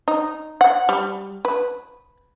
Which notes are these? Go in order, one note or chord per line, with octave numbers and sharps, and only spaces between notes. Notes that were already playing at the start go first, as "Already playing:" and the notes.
D#4
F#5
G3
B4